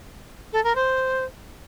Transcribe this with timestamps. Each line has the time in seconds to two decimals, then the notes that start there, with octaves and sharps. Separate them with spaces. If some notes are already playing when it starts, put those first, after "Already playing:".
0.52 A4
0.64 A#4
0.75 C5